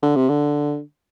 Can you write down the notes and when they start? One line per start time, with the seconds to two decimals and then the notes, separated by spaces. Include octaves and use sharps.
0.02 D3
0.16 C3
0.29 D3